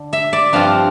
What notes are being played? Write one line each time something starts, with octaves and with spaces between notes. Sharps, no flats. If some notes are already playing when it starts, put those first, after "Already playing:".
Already playing: D3
E5
D5
G2 F3 C4 F4 F5